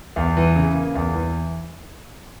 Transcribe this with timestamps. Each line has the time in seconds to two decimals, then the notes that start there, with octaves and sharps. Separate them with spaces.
0.16 E2
0.37 E3
0.56 C#3
0.75 A#3
0.95 E2
1.14 E3